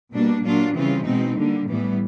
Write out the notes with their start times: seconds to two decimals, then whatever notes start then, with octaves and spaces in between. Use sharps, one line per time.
0.13 B2 G3 A#3 D4
0.45 A#2 F#3 A#3 D4 F4
0.76 C#3 E3 G3 C4 F4
1.06 B2 G#3 C4 D#4
1.38 D3 G3 A#3
1.69 A2 E3 G3 B3